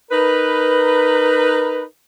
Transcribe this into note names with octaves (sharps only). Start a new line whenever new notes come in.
D#4 A#4 B4